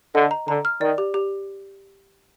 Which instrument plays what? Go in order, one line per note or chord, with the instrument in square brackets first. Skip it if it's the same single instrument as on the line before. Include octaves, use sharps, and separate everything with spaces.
[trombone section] D3 [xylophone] D#5
[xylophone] A#5
[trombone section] D3 [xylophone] A#5
[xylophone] F6
[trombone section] D#3 [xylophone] D5
[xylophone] G4
G4